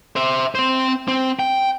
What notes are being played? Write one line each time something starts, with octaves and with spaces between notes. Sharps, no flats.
C5 E5
C4 C5
C4
G5